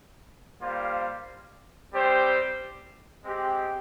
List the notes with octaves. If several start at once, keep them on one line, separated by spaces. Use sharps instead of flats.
G3 A#3 F4 C5 F5
G3 C4 G4 C5
G#3 C4 G4